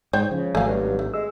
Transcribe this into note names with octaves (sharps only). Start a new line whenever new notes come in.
G#2 G#3 C5 C#5 G5
C#3 F3
G#1 F#3 A3 F5 G#5
G2 G3
A3
G#3 E6